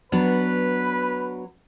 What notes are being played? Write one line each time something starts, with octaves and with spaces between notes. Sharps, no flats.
F#3 B3 D4 B4